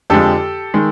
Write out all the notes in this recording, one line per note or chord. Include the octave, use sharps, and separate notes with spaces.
F2 D3 F3 G#3 G4 A4
D#3 G#3